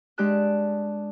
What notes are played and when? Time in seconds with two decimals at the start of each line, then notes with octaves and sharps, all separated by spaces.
0.18 G#3 D4 G4 D5 A5 F#6